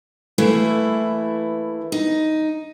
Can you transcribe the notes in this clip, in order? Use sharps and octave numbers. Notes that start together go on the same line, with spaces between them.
E3 A3 A#3 E4
D#4